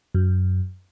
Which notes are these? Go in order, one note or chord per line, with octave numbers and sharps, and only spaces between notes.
F#2